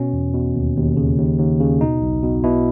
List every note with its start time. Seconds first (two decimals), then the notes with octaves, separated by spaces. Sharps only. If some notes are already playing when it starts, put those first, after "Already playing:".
Already playing: B2 C#4
0.13 E2
0.34 B2
0.55 D#2
0.76 D#2
0.97 C#3
1.18 D#2
1.39 D#2
1.60 C#3
1.81 B2 D#4
2.02 B1
2.23 B2
2.44 B2 E4